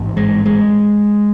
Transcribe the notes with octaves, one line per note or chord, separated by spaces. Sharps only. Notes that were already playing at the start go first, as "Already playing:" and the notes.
Already playing: A1 G#2
G#3
G#3